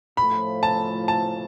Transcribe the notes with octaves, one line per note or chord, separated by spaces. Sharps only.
A2 F3 A3 B5
A5
A5